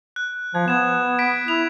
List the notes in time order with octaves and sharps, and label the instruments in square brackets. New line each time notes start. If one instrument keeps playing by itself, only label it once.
[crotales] F#6
[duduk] F3 [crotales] G#6
[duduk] B3 [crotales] G#6 E7
[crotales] G#6 B6 D7
[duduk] E4 [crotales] F7